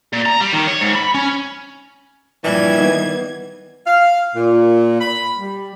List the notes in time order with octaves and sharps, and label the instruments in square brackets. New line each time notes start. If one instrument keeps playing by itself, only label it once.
[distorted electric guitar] A#2
A#5
G3
D#3
C#5
G#2
B5
C#4
[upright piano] A#1 G2 D5 [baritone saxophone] E3 [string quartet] G3 G#6
[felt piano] D#3 B3 [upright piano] D#5
[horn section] F5
A#2
B5
G3